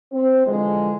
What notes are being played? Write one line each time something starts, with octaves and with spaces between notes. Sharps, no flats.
C4
D3 E3 F3 G#3